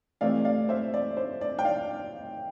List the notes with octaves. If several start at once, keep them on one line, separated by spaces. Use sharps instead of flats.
C3 E3 A3 C4 D5 F5
D5 F5
C5 E5
D5
C5
D5
G5
D5 F5